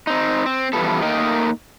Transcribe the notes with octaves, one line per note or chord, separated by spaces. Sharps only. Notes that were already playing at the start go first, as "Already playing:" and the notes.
C4 D#4
C4
E3 F3 G3 B3 A4
A3 A#3 D#4 A#4 D#5 G5